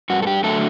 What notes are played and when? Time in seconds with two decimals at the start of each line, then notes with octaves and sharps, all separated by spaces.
0.10 G2 F#4
0.22 A4
0.27 G4
0.44 D3 F#3 A3 A4